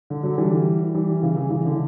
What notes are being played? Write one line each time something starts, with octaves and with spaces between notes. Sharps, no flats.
D3
D3 F#3
E3 G3
E3 G3
C#3 E3
C#3 E3
C#3 E3
D3